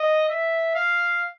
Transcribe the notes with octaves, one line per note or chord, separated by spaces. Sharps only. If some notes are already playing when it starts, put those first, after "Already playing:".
Already playing: D#5
E5
F5